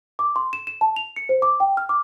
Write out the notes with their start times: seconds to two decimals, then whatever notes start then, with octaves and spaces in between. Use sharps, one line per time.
0.19 D6
0.36 C6
0.53 E7
0.67 E7
0.81 A5
0.96 F7
1.16 C#7
1.29 C5
1.42 D6
1.60 G5
1.77 F6
1.89 D6